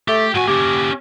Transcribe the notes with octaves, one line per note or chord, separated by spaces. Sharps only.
A3 G4
A2 F#4 G#5
A#3 C#4 G4